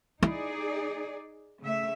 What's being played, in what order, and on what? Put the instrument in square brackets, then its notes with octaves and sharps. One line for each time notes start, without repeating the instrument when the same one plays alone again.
[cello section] D#4 G#4 D5 [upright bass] E4
[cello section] C#3 A3 E5